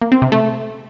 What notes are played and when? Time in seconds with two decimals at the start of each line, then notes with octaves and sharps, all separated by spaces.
0.01 A#3
0.12 C4
0.22 C3
0.32 A3